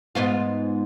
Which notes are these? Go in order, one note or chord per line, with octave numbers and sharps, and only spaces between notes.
G#2 B3 F4